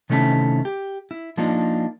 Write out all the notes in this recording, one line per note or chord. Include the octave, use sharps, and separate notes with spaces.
C3 D#3 A3 C#4 E4 A5
G4
E4
F3 A#3 D4 D#4 F4